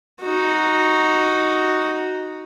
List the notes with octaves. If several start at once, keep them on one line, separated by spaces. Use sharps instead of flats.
D#4 F#4